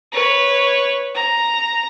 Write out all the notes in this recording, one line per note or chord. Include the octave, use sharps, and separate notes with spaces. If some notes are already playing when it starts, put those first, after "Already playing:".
B4 C#5
A#5